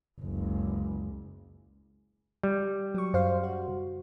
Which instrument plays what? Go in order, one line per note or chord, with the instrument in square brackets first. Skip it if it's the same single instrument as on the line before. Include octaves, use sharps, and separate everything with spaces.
[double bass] F#1 C#2
[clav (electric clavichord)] G3
[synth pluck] F#3 C#6
F#2 C5 F5
F#4